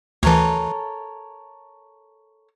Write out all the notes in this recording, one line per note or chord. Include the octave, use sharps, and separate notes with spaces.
D2 E3 A4 A#4 C#5